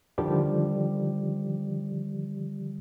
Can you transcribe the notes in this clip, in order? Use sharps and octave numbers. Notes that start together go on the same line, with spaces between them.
D3 D#3 F3 G3 G4